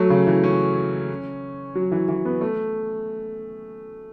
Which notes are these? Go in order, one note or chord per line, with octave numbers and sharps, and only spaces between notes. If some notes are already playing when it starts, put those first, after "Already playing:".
Already playing: F#3 A3
C#3
E3
C#4
F#3
E3
E3
B3
A3